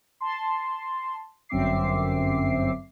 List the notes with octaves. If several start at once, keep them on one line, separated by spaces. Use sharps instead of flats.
A5 C6
G1 F#2 C4 E5 D6 C7